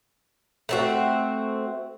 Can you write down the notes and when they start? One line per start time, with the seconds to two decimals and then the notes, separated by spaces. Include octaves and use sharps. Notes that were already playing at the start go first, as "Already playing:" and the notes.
0.69 A3 C4 F#4